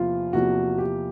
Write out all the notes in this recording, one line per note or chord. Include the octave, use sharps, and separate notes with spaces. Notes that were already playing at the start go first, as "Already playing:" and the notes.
Already playing: E2 C3 F3 A#3 F4
E2 C3 F3 A#3 F#4
G4